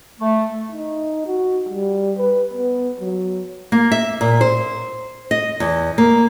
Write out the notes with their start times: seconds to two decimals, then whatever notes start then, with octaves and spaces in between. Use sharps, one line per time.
0.20 A3
0.72 D#4
1.27 F#4
1.69 G3
2.18 B4
2.53 B3
3.00 F#3
3.72 A#3
3.92 E5
4.21 A#2
4.41 C5
5.31 D#5
5.60 E2
5.98 A#3